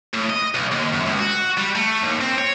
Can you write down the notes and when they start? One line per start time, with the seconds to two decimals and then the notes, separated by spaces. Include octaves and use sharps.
0.14 A2
0.30 D#5
0.55 B1
0.72 D#2
0.94 F#2
1.07 C#2
1.20 F#4
1.58 G3
1.75 A3
2.02 D#2
2.21 C4
2.38 C#5